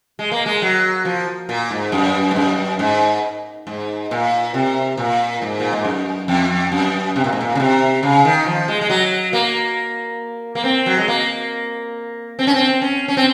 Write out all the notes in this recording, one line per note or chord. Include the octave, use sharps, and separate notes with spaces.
G#3
A#3
G#3
F#3
F3
A#2
G#2
F#2
G#2
F#2
G#2
G#2
A#2
C3
A#2
G#2
A#2
G#2
F#2
F2
F#2
C3
A#2
G#2
A#2
C#3
C3
C#3
D#3
F3
G#3
G#3
F#3
A#3
A#3
C4
F#3
G#3
A#3
C4
C#4
C4
C#4
C#4
C4